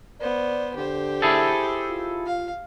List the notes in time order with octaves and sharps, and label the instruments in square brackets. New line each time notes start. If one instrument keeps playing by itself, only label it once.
[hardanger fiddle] B3 C5 [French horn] D5
[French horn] D3 [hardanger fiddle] G4 C5
[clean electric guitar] E4 G#4 A4
[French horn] F4
[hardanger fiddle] F5